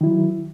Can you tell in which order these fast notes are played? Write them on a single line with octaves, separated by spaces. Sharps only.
D#3 E4 F#3